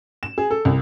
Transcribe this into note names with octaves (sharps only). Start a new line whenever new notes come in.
E7
G#4
A4
C2